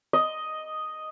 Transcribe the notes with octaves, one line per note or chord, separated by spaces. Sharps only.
D#5